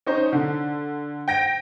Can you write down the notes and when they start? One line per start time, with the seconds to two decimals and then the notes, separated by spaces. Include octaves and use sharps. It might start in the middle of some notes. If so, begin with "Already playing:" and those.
0.06 C#4 D#4 C5
0.32 D3
1.28 G5 A#6 D7